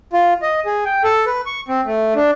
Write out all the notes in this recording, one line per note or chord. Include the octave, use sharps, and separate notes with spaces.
F4
D#5
G#4
G5
A4
B4
C#6
C4
A3
D4